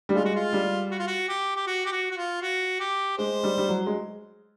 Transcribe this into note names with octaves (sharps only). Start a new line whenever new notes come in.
G3
G#3 F4
F#4
F4
G3
F#4
F4
F#4
G4
G4
F#4
G4
F#4
F#4
F4
F#4
G4
G#3 C5
G3
G3
F#3
G#3